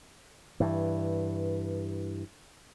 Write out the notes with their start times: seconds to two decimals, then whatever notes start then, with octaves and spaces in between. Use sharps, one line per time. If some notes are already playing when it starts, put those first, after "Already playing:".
0.60 G2 E3